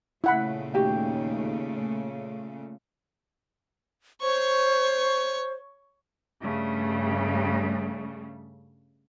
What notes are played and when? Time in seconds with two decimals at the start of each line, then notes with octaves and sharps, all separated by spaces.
0.24 A#2 C#3 A3 E4 F#5 B5
0.74 D#2 F#4 G4 G5
4.22 C5 C#5 C#6
6.42 G2 C#3 G3 A3